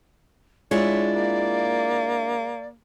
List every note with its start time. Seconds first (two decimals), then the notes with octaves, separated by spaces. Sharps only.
0.71 G#3 D4 E4 F4 C#5 D5
1.16 A#3